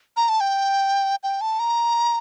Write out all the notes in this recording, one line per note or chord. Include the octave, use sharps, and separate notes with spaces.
A#5
A5
G5
G5
A5
A#5